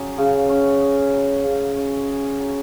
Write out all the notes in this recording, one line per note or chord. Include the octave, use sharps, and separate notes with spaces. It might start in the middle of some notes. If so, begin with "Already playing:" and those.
Already playing: F#3 C#4 G#4
C#3
C#4
G#4
F#3
C#3
C#4
G#4
F#3